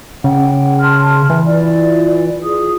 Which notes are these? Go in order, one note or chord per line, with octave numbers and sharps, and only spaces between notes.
C#3 F#5 G5
A5 C6 F6
E3
E4 F4 D5
F4 G#4 D#6